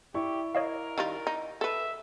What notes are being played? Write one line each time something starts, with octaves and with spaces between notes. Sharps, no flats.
E4 G4 D5 C#6
A#4 C#5 D#5 F5
D#3 G3 F4
D#4
A4 B4 E5